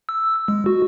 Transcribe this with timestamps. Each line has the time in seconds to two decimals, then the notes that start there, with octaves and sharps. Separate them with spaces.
0.09 E6
0.48 G#3
0.66 F#4